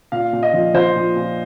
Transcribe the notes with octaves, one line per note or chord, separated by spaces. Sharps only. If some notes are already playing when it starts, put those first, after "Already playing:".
A#2 F5
A#2
D#5
F3
F3 C5
A#2
A#2